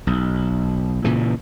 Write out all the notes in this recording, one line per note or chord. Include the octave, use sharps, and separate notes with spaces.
B1
A#2 C#3 E3